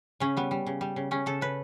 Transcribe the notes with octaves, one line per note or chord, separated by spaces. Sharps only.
C#3 C#4
G3 B3
G3
C#3
G3
C#3
C#3 C#4
C#3 A4
C#3 B4